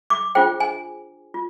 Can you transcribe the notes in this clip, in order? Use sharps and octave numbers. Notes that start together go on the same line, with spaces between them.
D6
D4 F4 G#4 C5 G5
G#5
F4